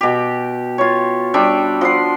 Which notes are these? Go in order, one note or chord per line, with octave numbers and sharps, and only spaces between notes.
B2 G4
F4 C#5
G3 D4 E5 G5
F3 F#5 C6